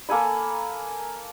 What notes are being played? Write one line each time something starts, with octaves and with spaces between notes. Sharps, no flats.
A#3 A4 G#5 B5